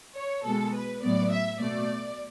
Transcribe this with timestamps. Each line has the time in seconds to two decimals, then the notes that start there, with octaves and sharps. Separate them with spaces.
0.15 C#5
0.45 B2 G#3 B3 A4
0.74 B4
1.03 A2 F#3 B3 D5
1.31 E5
1.60 B2 A3 D5